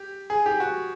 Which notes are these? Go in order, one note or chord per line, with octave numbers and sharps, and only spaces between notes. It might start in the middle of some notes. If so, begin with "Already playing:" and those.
Already playing: G4
G#4
G4
F#4